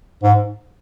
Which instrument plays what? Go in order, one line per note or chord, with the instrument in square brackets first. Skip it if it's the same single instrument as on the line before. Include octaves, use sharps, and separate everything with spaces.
[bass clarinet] G#2